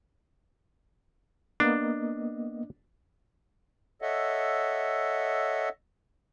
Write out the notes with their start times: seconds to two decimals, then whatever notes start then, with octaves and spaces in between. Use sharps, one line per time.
1.60 A#3 B3 D4 D#5
4.02 A4 C#5 D#5 E5 F#5